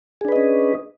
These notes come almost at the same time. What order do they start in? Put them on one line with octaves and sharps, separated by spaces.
G#4 D4 B4 D#5 C#4